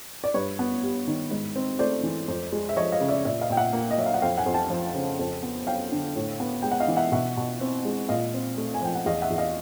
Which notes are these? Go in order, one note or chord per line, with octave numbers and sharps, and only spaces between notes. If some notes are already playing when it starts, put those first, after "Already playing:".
D5
G2 B4 C#5
B3
G3
D#3
G#2
C4
A3 C5 D5
E3
F2
G#3
E5
F3 C#5 D#5
D#5 F5
C#3
D5 E5
A#2 D5 E5
D#5 F5
A#2 G5
E5 F#5
A#3
D#5
F#3 E5
F5
F#5
F2 F5 G5
F#5 G#5
F2
G5 A5
F3
C#3
F2
B3
F#3 F5 G5
D3
A2
B3
G#3 G5
F#5
D#5 F5
E3
E5 F#5
B2 E5 F#5
B2
C4
G#3
A#2 D#5 F5
C4
A3
G#5
F3 G5
F#5
E2 D#5 F5
E5 F#5
E2
D#5 F5